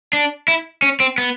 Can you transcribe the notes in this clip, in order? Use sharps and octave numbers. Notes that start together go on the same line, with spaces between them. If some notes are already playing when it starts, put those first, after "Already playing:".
D4
E4
C#4
C4
B3